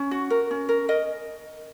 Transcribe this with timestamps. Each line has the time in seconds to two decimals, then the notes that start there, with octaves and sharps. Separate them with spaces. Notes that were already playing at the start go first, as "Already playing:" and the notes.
Already playing: C#4
0.11 F#4
0.30 A#4
0.51 C#4
0.69 A#4
0.89 A#4 D#5